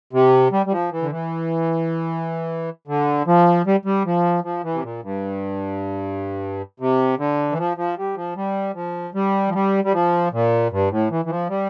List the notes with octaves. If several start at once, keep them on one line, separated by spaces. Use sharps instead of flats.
C3
G3
G3
F3
E3
D3
E3
D3
F3
G3
G3
F3
F3
E3
C3
A#2
G2
C3
D3
E3
F3
F3
G3
F3
G3
F3
G3
F3
G3
G3
F3
A#2
G2
A2
E3
E3
F3
G3